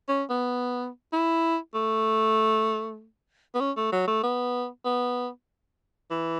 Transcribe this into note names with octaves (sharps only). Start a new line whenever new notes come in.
C#4
B3
E4
A3
B3
C#4
A3
F#3
A3
B3
B3
E3